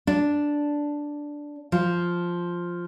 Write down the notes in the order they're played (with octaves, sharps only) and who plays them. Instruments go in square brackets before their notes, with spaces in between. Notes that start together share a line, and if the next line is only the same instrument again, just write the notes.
[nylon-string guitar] D4
F3